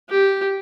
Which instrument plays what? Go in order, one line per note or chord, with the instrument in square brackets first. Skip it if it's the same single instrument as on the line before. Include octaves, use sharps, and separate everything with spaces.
[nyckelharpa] G4